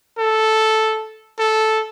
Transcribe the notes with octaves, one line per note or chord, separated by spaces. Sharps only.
A4
A4